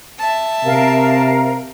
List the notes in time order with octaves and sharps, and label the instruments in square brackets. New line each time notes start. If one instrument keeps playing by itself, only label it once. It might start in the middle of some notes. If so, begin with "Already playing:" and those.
[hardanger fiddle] E5 A5
[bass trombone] C3 [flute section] A#4 F5